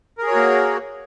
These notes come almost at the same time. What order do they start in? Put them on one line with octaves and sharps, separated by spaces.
A#4 G#4 C#5 F#4 A#3